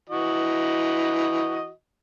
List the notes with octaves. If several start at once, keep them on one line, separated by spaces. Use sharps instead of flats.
E3 F#4 D#5